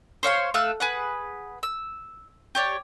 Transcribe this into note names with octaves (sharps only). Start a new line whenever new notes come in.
C5 C#5 F5 C6
A3 F5 E6 F#6
G#4 B4 F#5
E6
G4 C#5 D5